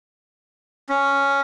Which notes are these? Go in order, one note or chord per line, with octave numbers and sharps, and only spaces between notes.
C#4